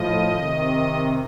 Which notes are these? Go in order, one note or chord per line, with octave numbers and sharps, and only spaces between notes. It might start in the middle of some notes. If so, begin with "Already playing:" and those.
Already playing: A2 F3 D#5
C3 D#3